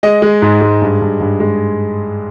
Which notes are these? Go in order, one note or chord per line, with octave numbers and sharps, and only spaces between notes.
G#3 D#5
G#3
G#2
G#3
G2
G2
G2
G#3